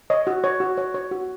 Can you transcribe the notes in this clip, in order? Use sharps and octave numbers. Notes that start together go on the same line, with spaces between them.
C#5 D#5
F#4
C#5
F#4
C#5
C#5
F#4